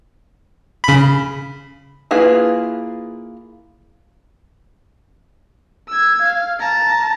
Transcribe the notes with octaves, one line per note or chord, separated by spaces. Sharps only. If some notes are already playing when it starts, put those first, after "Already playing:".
C#3 B5
A#3 E4 F4 G#4 B4
E6 G#6
F5
A5 A#5